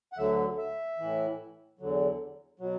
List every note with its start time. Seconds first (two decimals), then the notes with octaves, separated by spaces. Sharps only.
0.13 F#5
0.18 D2 D3 F#3 E5
0.58 E5
0.98 A2 E3
1.79 E2 D3 F#3
2.60 B2 F#3